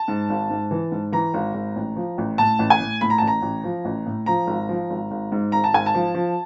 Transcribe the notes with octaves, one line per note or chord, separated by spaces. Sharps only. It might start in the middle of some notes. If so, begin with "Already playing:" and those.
Already playing: A5
G#2
G#1
G#2
E3
G#2
E3 A#5
G#1
G#1
A1
F3
A1
A2 A5
A1
G#5
A2
A2 B5
A#5
A1 A5
A#5
A1
F3
A1
A2
F3 A#5
G#1
F3
G#1
G#1
G#2
G#1 A#5
A5
G#1 G#5
A5
F3
F3